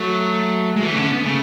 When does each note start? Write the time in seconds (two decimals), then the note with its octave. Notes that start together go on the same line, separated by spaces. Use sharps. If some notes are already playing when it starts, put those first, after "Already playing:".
Already playing: F#3 A3
0.76 G#3
0.82 E3 A3
0.93 C#3
0.97 D3 C#4
1.11 B3
1.25 C#3 A3